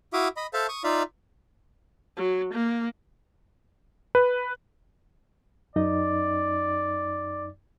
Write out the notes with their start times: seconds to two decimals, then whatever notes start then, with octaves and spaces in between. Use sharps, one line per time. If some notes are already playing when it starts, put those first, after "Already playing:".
0.13 E4 F#4 E5 F5 D6 D#6
0.37 D#5 B5
0.53 A4 C5 E5 F5 A5
0.69 C#6 D#6
0.84 D#4 F4 D5 E5 F5
2.17 F#3
2.54 A#3
4.15 B4
5.76 F#2 D#4 D5 D#5